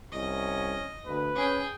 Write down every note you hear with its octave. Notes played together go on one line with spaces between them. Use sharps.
C2 C#4 D#5
D2 B4
C#4 G#4 G5